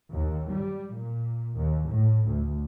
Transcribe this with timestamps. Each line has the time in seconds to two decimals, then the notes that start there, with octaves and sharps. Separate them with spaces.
0.12 D#2
0.52 G3
0.94 A#2
1.58 D#2
1.90 A2
2.28 D2